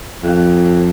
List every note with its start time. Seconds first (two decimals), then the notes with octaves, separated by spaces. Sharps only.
0.23 F2